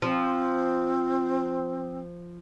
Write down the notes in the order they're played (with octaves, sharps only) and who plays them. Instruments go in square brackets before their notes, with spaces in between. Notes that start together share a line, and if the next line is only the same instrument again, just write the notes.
[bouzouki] F3 [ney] C4